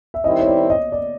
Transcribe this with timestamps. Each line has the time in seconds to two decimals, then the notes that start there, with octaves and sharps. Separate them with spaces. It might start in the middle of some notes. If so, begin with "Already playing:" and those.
0.14 E5
0.24 D#3 G3 C4 E4 D#5
0.40 C#5
0.47 D5
0.70 D#5
0.92 D5